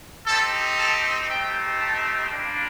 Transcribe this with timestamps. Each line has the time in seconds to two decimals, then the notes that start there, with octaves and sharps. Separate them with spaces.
0.26 C4 D#4 G4 A4
0.77 A4
1.28 A3 C4 D#4 G4 G5
1.79 A5
2.30 G3 A#3 D4 F4